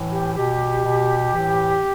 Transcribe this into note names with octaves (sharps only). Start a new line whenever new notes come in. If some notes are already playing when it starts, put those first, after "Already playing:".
Already playing: A2 E3
G4
B2 G4
B2
A2 E3